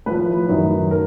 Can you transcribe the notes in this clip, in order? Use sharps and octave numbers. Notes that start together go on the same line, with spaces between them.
A2 F3 B4
F#2 D#3 F#3
A#4